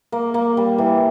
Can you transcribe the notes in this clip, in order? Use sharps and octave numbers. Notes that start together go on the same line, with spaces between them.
A#3
A#3
G3
E3